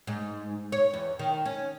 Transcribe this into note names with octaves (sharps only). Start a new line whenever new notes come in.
G#2
C#5
E2
D#3
C#4